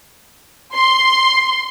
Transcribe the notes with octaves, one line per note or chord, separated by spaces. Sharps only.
C6